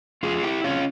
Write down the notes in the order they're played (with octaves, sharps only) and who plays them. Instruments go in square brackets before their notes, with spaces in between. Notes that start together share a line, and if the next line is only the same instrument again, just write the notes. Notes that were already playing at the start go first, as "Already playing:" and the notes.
[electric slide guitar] F2 F4 G#4
E4 G4
C#3 F3 C4 C#4 F4